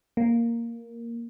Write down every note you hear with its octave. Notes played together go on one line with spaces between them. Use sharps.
A#3